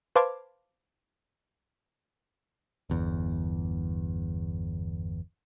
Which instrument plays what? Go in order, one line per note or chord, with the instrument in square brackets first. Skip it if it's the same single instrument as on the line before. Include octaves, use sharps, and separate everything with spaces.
[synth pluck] B4 C5 F5 A5 D6 G#6
[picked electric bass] G1 E2